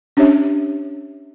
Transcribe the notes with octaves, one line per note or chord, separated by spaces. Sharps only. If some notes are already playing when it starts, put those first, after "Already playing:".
C#4 D4 G4 C#5 E5